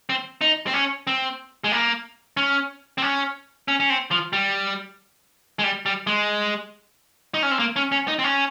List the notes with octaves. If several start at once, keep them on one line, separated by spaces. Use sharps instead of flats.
C4
D#4
C4
C#4
C4
G#3
A#3
C#4
C4
C#4
C#4
C#4
C4
F3
G3
G#3
G3
G3
G#3
D#4
C#4
C4
A#3
C#4
C#4
D#4
C4
C#4